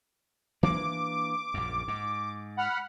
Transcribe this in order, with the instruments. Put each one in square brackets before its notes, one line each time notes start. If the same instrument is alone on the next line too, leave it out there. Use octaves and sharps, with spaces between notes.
[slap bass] E3 A#3 D4 [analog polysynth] D6
[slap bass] A#1 F#2
G#2
[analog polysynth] F#5 B5 F6